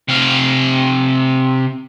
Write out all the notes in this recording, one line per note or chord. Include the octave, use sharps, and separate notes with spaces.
C3 F5